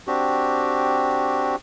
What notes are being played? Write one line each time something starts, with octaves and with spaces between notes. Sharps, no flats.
C4 D4 F#4 G4